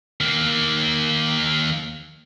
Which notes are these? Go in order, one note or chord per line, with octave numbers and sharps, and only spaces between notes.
D#2 A#3